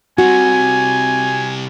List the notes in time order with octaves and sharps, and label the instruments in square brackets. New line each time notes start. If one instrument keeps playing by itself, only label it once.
[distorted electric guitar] C3 G3 [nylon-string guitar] F#4 [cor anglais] G#5